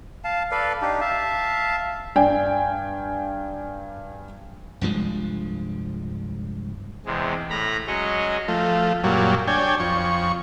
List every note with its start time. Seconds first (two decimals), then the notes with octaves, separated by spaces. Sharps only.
0.24 F5 A5
0.51 A4 B4 D5 F5
0.82 D4 D#4 G4
1.01 E5 F5 A5
2.16 G2 D5 G5 G#5
4.81 C2 G2 F3 G#3
7.06 E2 C3 G#3
7.50 A2 A#5 B5
7.87 F#3 G#3 C#4 C#5 D#5
8.48 F3 A3
9.04 F#2 A#2 F#3 G3
9.48 D4 C#5 G5 G#5
9.80 F2 C#6